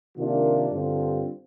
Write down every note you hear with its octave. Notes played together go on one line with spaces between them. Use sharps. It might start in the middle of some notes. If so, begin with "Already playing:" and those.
C3 D#3 A#3 D4 F4
G2 D3 G3 C4 F4